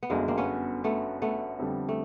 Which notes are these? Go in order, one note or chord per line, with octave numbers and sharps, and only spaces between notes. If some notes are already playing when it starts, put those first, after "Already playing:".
B3
G1 F#2 D3 G#3 A#3
A#3 C4
B3 C#4
A3 B3
A3 B3
F2 D3 G3
A3